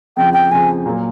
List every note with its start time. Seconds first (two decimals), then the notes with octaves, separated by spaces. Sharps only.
0.17 F2 C#3 F3 G5
0.34 G5
0.51 F2 C#3 F3 G#5
0.86 A#2 F#3 A#3